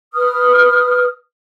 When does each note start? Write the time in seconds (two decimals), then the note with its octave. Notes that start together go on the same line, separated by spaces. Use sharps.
0.13 B4 D#6 F6